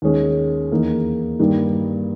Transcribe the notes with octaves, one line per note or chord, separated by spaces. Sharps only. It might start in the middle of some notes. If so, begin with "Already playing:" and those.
D#2 D#3 G#3 C#4 G#4
E2 D#3 A#3 D#4 G#4
G2 D#3 G3 A#3